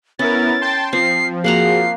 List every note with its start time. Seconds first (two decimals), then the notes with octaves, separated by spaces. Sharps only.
0.19 B3 C#4 E4 A#4 A6
0.61 G5 A5 C6
0.93 F3 C4 C7
1.44 A#3 F#4 G#4 F#5 A#5 C7